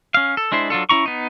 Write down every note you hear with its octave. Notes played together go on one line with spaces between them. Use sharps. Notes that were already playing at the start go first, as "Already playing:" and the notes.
C#4 F5
A4
G#3 D4 E4 C5
F#3 D4 F4 A4
C#4 E4 A#5 C#6
B3 D#4